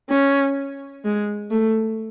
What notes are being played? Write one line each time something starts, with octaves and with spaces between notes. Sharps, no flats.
C#4
G#3
A3